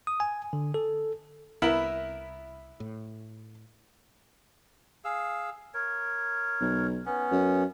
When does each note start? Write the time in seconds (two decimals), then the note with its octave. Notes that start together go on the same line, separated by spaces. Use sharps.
0.07 D#6
0.20 G#5
0.53 D3
0.74 A4
1.62 C2 B3 E4 A#4 E5
2.80 A2
5.05 G#4 F5 E6
5.74 A#4 C#5
6.60 B1
7.06 B3 C#4
7.31 F#2